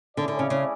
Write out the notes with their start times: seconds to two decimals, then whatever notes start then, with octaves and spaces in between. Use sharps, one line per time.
0.17 D3 A3 C#4 E4 G#4 D5
0.28 D3
0.39 C#3
0.50 C#3